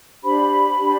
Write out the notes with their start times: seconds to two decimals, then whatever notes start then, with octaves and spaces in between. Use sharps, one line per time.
0.23 D4 G4 C5 B5
0.78 D4 G4 C5